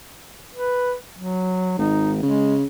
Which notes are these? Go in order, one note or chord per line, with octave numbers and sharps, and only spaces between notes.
B4
F#3
G#1 D#4
C#3 G#3